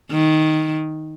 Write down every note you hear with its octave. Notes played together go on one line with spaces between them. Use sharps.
D#3